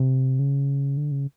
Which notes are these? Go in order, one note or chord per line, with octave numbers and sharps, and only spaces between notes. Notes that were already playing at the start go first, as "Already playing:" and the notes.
Already playing: C3
C#3
D3
C#3